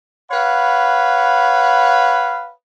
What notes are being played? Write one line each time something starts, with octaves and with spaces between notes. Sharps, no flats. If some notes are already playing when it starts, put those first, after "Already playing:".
B4 C#5 F5 F#5 B5